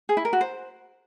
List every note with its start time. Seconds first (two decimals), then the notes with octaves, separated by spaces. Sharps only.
0.09 G#4
0.17 E4
0.25 A#4
0.33 F#4
0.41 C5